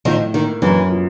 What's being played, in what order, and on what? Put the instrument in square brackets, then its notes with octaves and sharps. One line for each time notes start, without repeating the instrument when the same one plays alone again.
[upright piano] A2 [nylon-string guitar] D#3 F3
[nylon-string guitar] D#3 [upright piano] A#3
[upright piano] F#2 [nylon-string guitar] E3
[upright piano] F3